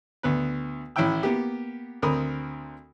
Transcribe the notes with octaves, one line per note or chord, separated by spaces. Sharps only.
D2 B3 B4
A1 E4 C#5 E5 G5 E6
A#3 B3 G4
D2 C4 A#4 B5 D#6